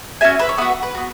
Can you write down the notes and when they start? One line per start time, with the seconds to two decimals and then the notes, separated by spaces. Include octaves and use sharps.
0.21 C#4 F#4 E5 G#5
0.39 B4 E5
0.49 C#5
0.58 B3 F#4 B4 E5
0.83 B4
0.95 B3 F#4